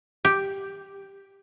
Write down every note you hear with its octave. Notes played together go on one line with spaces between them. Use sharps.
G4